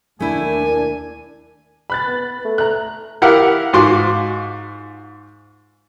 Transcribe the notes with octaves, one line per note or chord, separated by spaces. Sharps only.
D#2 A3 D4 E4 A#4 G#5
B5 F#6 A6
B3
A3
A#5 F#6
E4 G4 A#4 F5 F#5
G#2 F4 F#4 C6 D6